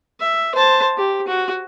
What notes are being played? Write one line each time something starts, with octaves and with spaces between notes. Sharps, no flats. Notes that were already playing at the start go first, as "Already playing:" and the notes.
E5
C5 A5
G4
F#4